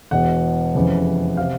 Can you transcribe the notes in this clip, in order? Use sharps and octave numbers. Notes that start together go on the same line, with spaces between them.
E1 E2 B2 F#5
F1 F2 C#3 E3
C3 F5